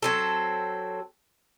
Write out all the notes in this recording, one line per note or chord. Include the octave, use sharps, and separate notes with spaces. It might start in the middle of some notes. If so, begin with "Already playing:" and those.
F#3 C4 A4